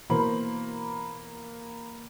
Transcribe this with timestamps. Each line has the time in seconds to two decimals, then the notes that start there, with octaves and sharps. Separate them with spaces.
0.10 B2 E3 A#3 C5 B5